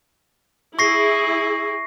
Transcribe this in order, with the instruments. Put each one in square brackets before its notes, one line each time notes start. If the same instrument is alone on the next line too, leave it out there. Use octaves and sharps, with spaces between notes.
[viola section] E4 G#4 [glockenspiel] C#6 A#6 C7